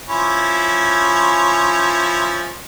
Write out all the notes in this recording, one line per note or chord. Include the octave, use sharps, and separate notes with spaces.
F3 C#4 E4